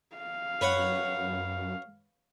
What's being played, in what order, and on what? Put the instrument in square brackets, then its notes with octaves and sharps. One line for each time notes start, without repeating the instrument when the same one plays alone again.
[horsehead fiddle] F5
[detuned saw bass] F#2 [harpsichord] B4 C#5 F#5